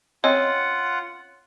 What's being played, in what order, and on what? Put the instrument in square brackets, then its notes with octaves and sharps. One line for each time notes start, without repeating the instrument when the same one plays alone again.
[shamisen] C4 C#4 D#5 [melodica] F4 F#5 [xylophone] C#5